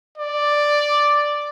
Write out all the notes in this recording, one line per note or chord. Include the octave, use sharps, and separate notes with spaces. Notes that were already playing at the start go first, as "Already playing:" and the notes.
D5